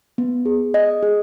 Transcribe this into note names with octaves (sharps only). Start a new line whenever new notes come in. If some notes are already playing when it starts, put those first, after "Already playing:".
B3
G#4
D#5
G#4